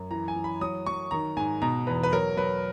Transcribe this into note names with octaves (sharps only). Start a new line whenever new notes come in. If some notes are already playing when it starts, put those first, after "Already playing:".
Already playing: F#2
E3 A#5
G#5
E3
B5
F#3 D#6
F#3 C#6
D#3 A#5
G#2 G#5
B2 A#5
E2 B4
B4
F#3 A#4
F#3 B4